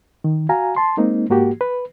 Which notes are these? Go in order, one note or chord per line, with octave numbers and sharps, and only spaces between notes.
D#3
F#4 F5 G#5 A#5
A5 C6
G#3 A#3 C4 D#4
G#2 A#3 F#4 G4
B4